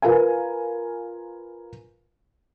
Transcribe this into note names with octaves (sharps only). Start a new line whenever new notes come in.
F4 A#4 B4 F5 G#5